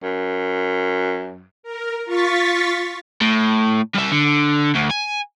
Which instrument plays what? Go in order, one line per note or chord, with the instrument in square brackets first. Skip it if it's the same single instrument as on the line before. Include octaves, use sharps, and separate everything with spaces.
[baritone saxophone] F#2
[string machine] A#4
F4 C#6 A6 B6
[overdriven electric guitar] A2
G3 E5
D3
D2
G#5